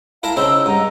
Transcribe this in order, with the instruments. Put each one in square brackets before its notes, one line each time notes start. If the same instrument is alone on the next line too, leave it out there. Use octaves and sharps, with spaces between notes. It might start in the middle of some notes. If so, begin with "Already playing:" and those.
[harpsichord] E4 A#4 E5 [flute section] F5 A5
[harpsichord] C#3 C4 D#4 [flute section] E6
[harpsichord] G2 [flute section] D#5 F#5 A#5